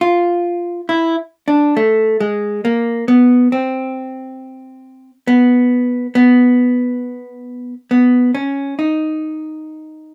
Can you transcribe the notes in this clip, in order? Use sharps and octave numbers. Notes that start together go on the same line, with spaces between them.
F4
E4
D4
A3
G#3
A#3
B3
C4
B3
B3
B3
C#4
D#4